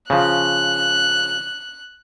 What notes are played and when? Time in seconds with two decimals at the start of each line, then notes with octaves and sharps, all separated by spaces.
0.10 C#3 F3 F#6